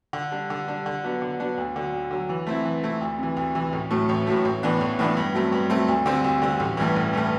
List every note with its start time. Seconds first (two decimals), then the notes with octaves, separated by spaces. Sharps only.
0.13 D3
0.32 G3 D4
0.50 D3
0.68 G3 D4
0.86 D3
1.03 F#3 B3 D4
1.22 D3
1.39 F#3 B3 D4
1.58 D2
1.76 D3 F#3
1.93 D2
2.11 D3 F#3
2.29 E3
2.47 A3 C4 E4
2.65 E3
2.84 A3 C4 E4
3.01 D2
3.19 C3 E3
3.37 D2
3.55 C3 E3
3.73 A1
3.91 A2 F#3 A3
4.09 A1
4.27 A2 F#3 A3
4.45 A1
4.63 A2 E3 B3 D4
4.81 A1
4.99 A2 E3 B3 D4
5.17 G2
5.34 F#3 A3 C4
5.52 G2
5.70 F#3 A3 C4
5.88 D2
6.06 D3 G3 C4
6.24 D2
6.42 D3 G3 C4
6.60 A1
6.77 G2 E3 A3
6.96 A1
7.13 G2 E3 A3